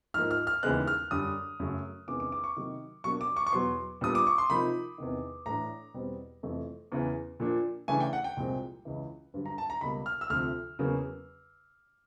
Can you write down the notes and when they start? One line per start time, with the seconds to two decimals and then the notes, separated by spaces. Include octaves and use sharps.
0.14 G#2 F3 A#3 F6
0.31 F6
0.47 F6
0.63 D#2 C#3 E3 G#3 B3 F#6
0.87 F6
1.11 F#2 D3 G3 D#6
1.60 F#2 C#3 F#3 A3
2.08 E2 C3 D#3 G#3 C#4 D6
2.20 D6
2.32 D6
2.44 C#6
2.56 C3 D#3 F#3 A#3
3.04 B2 F#3 A#3 D4 C#6
3.21 D6
3.37 C#6
3.47 C#6
3.53 E2 B2 F#3 B3 C6
4.01 A#2 G3 B3 D4 D#6
4.15 D6
4.27 C#6
4.38 C6
4.50 C3 F3 A#3 D#4 B5
4.98 E2 C3 D#3
5.46 A2 E3 A3 D4 A#5
5.94 E2 B2 G3 C4
6.43 F2 C3 E3 A3
6.92 E2 C#3 E3
7.40 A#2 F3 A#3 D4
7.88 C#3 E3 A3 D4 G#5
8.00 G5
8.13 F#5
8.24 G5
8.37 C2 A#2 F3 G#3 C4
8.85 C#2 C#3 E3
9.34 G2 D3 F#3
9.46 A#5
9.58 A5
9.70 A#5
9.81 C#2 B2 G3 A#3 B5
10.06 F6
10.21 E6
10.30 D2 C3 F3 F6
10.79 E2 C#3 F#3 A#3